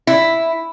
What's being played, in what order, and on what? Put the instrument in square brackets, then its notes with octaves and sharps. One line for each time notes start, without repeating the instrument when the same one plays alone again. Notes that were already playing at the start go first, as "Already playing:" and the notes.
[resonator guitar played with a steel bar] E4